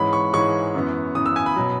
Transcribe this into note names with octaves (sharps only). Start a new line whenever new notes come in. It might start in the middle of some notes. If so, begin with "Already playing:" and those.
Already playing: G#2 E3 G#3 C#4 B5
C#6
G#2 E3 G#3 C#4 C#6
F#2 E3 B3
F#2 E3 B3 D#6
E6
G#5
B5
B2 F#3